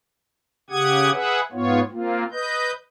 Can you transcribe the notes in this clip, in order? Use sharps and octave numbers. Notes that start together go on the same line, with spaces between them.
C#3 G4 F#5 D#6 G#6
G#4 B4 E5 F#5
G#2 B3 F4 C#5
A#3 C4 F4
B4 D#5 G6